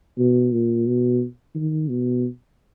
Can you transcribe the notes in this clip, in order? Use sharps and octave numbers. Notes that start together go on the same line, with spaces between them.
B2
A#2
B2
D#3
B2